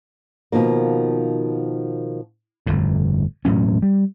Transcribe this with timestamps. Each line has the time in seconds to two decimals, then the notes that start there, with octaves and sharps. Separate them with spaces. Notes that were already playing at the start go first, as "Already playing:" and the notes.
0.52 B2 D#3 F3 A#3
2.66 G1 F2 A2
3.45 E1 A2 F#3 C#4
3.82 G3